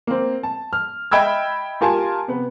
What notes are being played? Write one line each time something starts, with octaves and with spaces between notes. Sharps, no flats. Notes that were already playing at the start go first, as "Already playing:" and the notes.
A#3 C4
A5
F6
D#5 E5 G5 B5 E6 G#6
F4 G4 A#4 G#5 A5 C6
C3 B3 B4